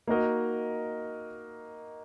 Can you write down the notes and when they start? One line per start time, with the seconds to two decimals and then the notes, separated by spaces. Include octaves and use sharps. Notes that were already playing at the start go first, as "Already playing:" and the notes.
0.08 A#3 D#4 F#4 A#4 D#5